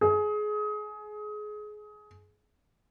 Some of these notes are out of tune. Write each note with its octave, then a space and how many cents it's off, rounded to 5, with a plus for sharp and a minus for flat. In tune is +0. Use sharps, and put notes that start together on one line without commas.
G#4 +25